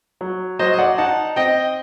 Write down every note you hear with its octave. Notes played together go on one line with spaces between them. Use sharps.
F#3
F#3 C5 D#5
D#5
D5 F#5
D#4 F#5 A5
C4 D#5 G5